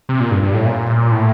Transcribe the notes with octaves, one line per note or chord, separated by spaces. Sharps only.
C3
A#2
G2
G2
A2
A#2
A2